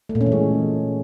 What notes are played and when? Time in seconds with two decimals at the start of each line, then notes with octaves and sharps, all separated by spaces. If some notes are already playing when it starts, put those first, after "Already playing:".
0.09 A3
0.15 A#2
0.21 C#4
0.26 E3
0.32 G#3